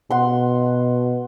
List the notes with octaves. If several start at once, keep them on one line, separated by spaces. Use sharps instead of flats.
B2 F#5 C6